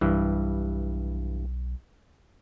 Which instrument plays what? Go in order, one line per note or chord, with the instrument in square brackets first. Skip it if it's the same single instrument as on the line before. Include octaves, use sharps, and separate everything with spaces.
[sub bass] B1 [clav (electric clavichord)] G2 E3